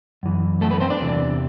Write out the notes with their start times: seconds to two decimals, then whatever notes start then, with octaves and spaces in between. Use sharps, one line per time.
0.23 F#2 E3
0.61 A3 A4
0.70 B3 B4
0.80 C4 C5
0.90 D4 D5
1.00 E2 C3 E3